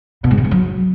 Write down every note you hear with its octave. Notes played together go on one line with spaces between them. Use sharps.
B2
G#2
D#3
F3
F#3